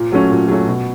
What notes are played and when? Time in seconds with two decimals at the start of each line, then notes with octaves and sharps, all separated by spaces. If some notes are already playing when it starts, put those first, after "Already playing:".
Already playing: A#2
0.12 F#3 A3 C#4
0.30 A#2
0.48 F#3 A3 C#4
0.67 B2